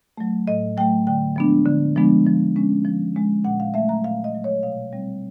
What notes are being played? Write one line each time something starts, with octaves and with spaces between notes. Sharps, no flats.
F#3 A3
A2 D#5
F#3 A3 G5
D3 G5
F3 G#3 B3 D4
D3
F3 G#3 B3 D4
F3
G#3 C#4
F3
G#3 C#4
A#2 F#5
F5
F#3 A3 E5
A#5
A#2 F5
D#5
F#3 A3
C#5
B2 F5
G3 C4